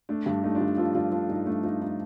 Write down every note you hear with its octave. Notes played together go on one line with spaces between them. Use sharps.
A3 D4
G2
A3 D#4
D4 F4
G2
F3 F4 A4
G2 D4 F4
F3 D4
G2 D#4
A3 D4
F3 D#4
D#4